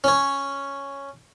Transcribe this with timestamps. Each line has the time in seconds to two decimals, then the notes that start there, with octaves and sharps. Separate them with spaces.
0.04 C#4 C#5